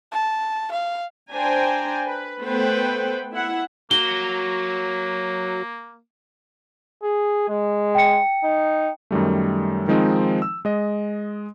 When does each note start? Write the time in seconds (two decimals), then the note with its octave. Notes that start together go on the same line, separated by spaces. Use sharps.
0.11 A5
0.72 F5
1.31 D4 C5 G5 G#5 A#5
2.06 B4
2.40 A3 B3 B4 C5 G5
3.33 E4 F#5
3.91 F#3 A#3 G7
7.03 G#4
7.48 G#3
7.95 G5 C#7
8.44 D#4
9.11 F#2 D#3 G3 A3
9.88 D#3 F3 G#3 C4 D#4
10.42 E6
10.65 G#3 D#5